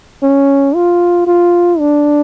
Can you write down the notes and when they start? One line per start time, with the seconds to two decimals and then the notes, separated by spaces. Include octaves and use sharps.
0.23 C#4
0.75 F4
1.27 F4
1.79 D4